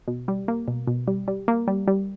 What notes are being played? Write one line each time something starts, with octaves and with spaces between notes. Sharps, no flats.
B2
G3
A#3
B2
B2
G3
G3
A#3
G3
G3